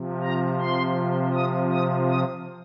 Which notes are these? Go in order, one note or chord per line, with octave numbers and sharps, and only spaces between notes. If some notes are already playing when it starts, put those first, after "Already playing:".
Already playing: C3 F3
A#5
C6
D#6
D#6
D#6